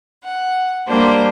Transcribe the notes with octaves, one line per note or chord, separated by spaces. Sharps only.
F#5
G3 A#3 D4 C5